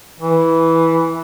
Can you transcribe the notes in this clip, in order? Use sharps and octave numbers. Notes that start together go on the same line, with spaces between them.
E3